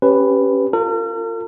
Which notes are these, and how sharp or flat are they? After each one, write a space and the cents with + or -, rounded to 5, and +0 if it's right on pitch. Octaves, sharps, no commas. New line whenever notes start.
C#4 -10 G4 +0 B4 +5
F4 +0 A#4 -45